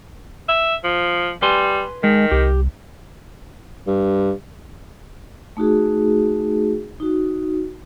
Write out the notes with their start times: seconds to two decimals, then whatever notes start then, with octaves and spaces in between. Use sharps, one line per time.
0.49 E5
0.84 F3
1.42 G3 B4 G#5 C6
2.04 D#3 G#3
2.31 C2 G4
3.87 G2
5.57 A3 D#4 F#4 G#4
7.00 D#4 F#4